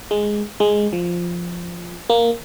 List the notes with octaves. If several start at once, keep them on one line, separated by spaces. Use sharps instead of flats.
G#3
G#3
F3
A#3